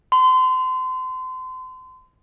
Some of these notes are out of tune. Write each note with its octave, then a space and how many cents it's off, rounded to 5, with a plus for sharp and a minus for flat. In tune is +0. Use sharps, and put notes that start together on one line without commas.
C6 -30